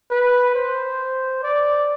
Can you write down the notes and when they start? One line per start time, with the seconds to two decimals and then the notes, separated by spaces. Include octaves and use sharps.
0.11 B4
0.55 C5
1.43 D5